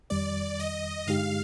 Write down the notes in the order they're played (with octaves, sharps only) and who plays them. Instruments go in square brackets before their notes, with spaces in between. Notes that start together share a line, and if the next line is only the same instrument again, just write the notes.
[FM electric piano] F2 D#3 G3 [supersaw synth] D5
[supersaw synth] D#5
[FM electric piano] G2 D3 G#3 D#4 G4 [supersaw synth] F5